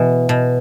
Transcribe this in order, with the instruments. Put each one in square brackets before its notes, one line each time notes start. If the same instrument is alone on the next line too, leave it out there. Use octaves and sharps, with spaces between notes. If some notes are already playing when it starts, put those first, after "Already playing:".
Already playing: [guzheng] B2 E3
B2